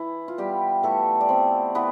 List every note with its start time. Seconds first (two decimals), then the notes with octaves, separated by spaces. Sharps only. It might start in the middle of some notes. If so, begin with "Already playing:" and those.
Already playing: E3 E4
0.28 F4
0.38 G3 B3 G4
0.83 E3 A3 A4
1.21 D5
1.29 B3 C4 C5
1.75 E3 B3 B4